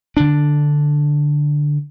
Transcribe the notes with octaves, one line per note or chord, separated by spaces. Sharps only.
D3 D4